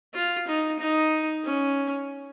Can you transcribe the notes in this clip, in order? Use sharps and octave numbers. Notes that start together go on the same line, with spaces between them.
F4
D#4
D#4
C#4